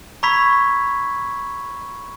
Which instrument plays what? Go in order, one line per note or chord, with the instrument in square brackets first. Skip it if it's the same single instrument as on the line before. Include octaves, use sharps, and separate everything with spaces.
[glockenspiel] A#5 B5 C#6 E6 G#6 B6